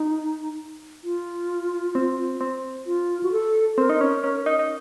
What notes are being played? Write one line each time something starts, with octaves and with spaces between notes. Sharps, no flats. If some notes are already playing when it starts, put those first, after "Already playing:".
Already playing: D#4
F4
C4
C4
F4
F#4
A4
C4 A#4
D#4
C#4
C#4
D#4
D#4